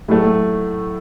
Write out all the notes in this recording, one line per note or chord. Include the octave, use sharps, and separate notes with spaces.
A2 F#3 A3